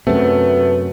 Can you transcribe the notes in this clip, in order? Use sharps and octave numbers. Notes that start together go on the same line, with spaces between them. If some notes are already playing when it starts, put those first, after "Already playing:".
F#2 C3 A3 B3